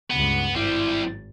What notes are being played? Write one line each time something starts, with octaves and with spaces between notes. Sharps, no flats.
C#2 G2 B3
G#1 G3 C4 E4